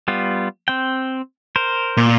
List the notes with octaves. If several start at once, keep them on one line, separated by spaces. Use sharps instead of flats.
G3 B3 F4
C4 G5
A#4 C5
A#2